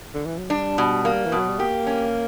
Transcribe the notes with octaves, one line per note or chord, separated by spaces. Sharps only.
D3
E3
F#3
G3 D4
B2
A#3
E3
B2 F#3
G3
A#3 G4
C#4